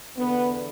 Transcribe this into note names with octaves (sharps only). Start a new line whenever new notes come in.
E2 D3 B3